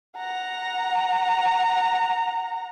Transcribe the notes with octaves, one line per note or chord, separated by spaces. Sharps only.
F#5 A#5